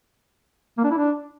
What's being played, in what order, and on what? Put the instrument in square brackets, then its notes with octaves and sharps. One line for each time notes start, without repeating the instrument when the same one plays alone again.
[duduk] A#3
D4
E4
D4